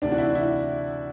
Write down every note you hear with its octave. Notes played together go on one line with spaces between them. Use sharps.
D2 C3 E3 D4
F#4
E4
E4